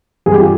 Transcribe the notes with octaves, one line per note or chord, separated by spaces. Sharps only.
G2 G#4
G4
F4 G#4